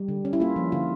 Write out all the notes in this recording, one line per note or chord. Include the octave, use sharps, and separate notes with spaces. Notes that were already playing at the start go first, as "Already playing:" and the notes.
Already playing: G3
D3
C#4
E4
A#3 F4
F3
D3 F4